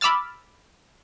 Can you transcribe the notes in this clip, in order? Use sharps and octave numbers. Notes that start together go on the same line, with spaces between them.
B5 D6 E6 F6 A6